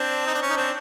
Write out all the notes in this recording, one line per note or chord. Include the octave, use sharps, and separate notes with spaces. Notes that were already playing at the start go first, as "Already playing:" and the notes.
Already playing: C4 D4
D#4
D4
C#4
D#4
C4 D4